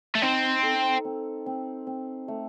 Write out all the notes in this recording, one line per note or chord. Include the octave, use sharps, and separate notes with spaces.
A3
C4 D#4
A4
C4
C4
C4
A3